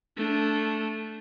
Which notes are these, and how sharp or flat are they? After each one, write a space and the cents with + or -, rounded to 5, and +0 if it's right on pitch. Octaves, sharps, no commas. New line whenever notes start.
A3 +0 D4 -15